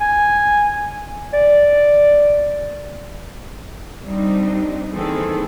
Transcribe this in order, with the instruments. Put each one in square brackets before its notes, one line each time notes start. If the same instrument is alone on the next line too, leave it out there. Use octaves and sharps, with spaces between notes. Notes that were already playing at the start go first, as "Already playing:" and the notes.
[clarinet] G#5
D5
[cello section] G3 C4 D4 D#4
D#3 E3 A#3 C4 G#4 A4